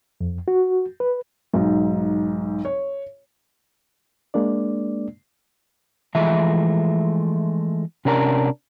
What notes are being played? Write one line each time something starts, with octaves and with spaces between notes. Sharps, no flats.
F2
F#4
B4
B1 G#2
C#5
G#3 A#3 D4 D5
E3 F3 G#3 A3 E5
C3 C#4 D4 A#4